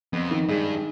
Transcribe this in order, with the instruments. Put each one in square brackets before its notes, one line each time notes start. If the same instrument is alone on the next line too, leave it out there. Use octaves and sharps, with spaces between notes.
[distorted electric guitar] F2 [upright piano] B3
[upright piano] D#3
[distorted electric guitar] G2 [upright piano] G#3